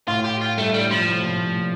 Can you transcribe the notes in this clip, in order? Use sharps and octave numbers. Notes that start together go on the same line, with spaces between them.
A2 F4
G4
F4
G2 A3
A2 G3
G2 F3
A2
C3
A#2
A2
A#2